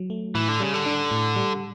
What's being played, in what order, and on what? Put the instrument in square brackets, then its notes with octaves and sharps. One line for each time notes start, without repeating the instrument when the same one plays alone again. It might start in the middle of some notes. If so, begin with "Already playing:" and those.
Already playing: [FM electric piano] F#3
A3
[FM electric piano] A2 [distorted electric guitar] E3
[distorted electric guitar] D3
[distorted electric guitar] C#3 [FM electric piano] G3
[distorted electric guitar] D3
[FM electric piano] D4
A2
G3